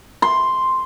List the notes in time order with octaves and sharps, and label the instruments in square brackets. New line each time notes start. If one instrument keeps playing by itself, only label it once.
[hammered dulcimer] C6